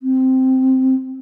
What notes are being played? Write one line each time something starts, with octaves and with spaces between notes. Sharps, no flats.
C4